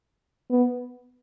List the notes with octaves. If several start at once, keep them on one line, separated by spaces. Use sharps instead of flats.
B3